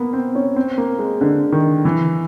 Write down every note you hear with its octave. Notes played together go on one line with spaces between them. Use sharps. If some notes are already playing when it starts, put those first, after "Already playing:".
Already playing: A#3 B3
C4
C#4
C4
A#3
G#3
D3
D#3
E3